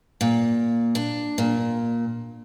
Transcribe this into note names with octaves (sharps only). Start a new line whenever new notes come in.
A#2
D4
A#2